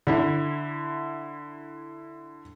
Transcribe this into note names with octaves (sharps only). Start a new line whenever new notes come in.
D3 E4